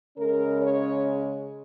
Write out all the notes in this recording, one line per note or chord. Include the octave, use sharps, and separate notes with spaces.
C#3 G#3 C#4 A#4
C#5